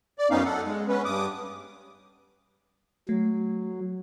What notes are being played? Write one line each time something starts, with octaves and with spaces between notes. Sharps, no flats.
D5
F#2 B3 C#4 D#4 F5
A4 F#5
G#3
B3 C#4 B4
G2 D6 D#6
F#3 A3